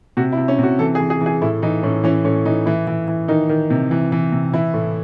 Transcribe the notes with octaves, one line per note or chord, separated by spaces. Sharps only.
C3 F#4
E4
C3
C#4
C3 F#4
E3 A4
G#4
E3
G#4
E3
G#4
A2 E4
E3 D#4
A2 C#4
E3 C#4
A2 C#4
E3 D#4
E3 E4
E3
E3
D#3 D#4
D#3
C3
E3
E3
C3
E3 E4
A2